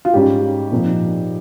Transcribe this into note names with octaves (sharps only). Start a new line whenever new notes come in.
F4
G#2 G3 C#4 G4
A#2 F3 C4 D#4